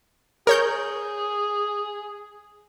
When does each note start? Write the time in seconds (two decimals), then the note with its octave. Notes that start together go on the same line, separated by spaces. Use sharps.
0.47 G#4 A#4 C#5 G6